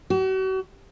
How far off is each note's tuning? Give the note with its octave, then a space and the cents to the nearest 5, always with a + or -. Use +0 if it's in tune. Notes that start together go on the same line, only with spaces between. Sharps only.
F#4 +40